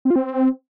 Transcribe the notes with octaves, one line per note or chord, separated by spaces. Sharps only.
C4
F4
C4